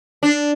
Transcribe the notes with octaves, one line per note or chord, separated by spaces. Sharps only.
D4